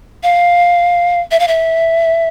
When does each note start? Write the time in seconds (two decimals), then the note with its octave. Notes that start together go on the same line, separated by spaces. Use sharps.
0.23 F5
1.31 E5
1.40 F5
1.48 E5